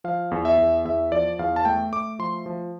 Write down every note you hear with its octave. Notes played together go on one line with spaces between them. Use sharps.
F3 F5
E2
E5
E2
E2 E5
F3 D5
E2 F5
A5
A3 G5
A3 D6
F3 C6
F3